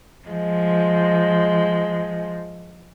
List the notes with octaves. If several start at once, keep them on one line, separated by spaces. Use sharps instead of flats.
F3 G#3